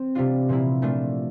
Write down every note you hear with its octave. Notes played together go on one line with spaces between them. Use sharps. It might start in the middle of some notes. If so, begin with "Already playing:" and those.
Already playing: C4
C3 G3 D4 F4
A#2 F3 A#3 E4
A#2 A3 D4 F4